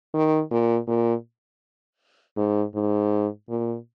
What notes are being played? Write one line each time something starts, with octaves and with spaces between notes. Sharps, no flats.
D#3
A#2
A#2
G#2
G#2
A#2